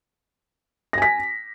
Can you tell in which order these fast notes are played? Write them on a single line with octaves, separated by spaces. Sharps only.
A#6 G#5 B6